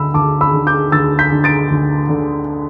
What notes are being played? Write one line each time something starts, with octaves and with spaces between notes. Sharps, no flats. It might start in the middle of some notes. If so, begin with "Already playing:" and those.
Already playing: D2 D3 B5 E6
D2 A5 D6
B5 E6
D3
D6 G6
D2 E6 A6
G6 B6
D3
A6 D7
D2
D3